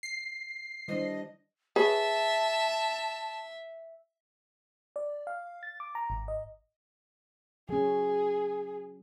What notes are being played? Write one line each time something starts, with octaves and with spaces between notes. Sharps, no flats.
C7
D#3 G3 D4 E4 C5 D#5
G#4 B4 C#5 E5 A5
D5
F5
A6
D6
A#5
G#1
D#5
F#3 C#4 G#4